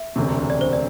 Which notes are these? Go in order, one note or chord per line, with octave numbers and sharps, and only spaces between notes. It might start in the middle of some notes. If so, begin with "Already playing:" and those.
Already playing: E5
E1 D2 C3
D5
C5
D5